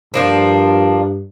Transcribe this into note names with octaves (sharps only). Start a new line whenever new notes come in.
G2 F3 A#3 D4